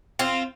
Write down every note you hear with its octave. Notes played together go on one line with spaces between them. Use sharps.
C4 F4